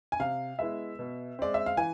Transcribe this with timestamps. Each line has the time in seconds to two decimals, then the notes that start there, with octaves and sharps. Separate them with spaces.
0.12 G#5
0.20 C3 F5
0.59 G#3 B3 E4 E5
0.99 B2
1.39 G#3 C4 D5
1.54 E5
1.66 F5
1.77 E3 G#5